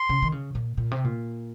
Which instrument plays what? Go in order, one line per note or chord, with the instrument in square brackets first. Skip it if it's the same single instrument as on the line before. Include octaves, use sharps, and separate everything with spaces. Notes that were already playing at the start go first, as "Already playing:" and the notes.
Already playing: [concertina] C6
[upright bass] C#3
D#3
C#3
A#2
A#2
C3
A#2